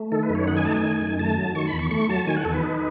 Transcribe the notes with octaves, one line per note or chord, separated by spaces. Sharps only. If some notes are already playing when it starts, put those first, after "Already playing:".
Already playing: A3
D#3 A4
B4
F#2
C#5
D#4 F#5
G#5
A3 A5
G#5
D#3
F#2
A3 A5
F#3
D#3 C#6
B5
E2
C#6
A3 C#6
F#3 A5
D#3 G#5
F#5
E2 A4
B4
D#4